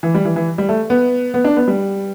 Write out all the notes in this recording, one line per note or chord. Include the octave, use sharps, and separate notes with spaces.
E3
G3
E3
E3
G3
A3
B3
B3
D4
B3
G3